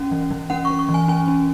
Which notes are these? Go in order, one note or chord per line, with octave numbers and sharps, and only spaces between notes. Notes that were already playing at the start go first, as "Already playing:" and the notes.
Already playing: C#4 F#5
E3
E3
C#4 F#5
C#6
C#4
C#6
E3
G#5
C#4 G#5
C#4